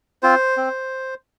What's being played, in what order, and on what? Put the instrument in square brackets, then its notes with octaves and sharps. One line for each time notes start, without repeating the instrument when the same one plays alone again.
[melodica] C4 F4 C5
C4